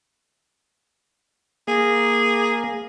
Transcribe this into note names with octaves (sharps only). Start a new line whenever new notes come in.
A#3 G#4